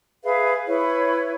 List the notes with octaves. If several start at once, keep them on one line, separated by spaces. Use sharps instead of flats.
G#4 B4 E5 F5
E4 B4 C#5